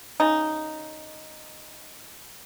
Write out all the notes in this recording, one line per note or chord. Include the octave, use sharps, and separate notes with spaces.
C#3 D#4